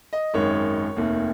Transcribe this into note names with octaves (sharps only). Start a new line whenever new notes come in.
D#5
G#1 F#2 D#3 G#3 C#5
F1 D#2 D#3